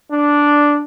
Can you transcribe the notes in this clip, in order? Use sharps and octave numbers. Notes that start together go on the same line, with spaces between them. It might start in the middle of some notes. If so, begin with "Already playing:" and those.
D4